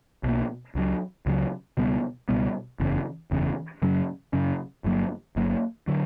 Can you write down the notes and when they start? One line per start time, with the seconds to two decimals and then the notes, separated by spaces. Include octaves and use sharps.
0.23 B1 B2 A#3
0.75 C#2 C#3 F#3
1.26 C#2 C#3 F#3
1.77 C#2 B2 G3 B3
2.29 C#2 B2 G3 B3
2.80 F#1 E2 C#3
3.31 F#1 E2 C#3
3.82 F#2 C#3 F#3 C#4
4.33 F#2 C#3 F#3 C#4
4.84 G1 G2 F#3 A#3
5.36 G1 G2 F#3 A#3
5.88 D3 F#3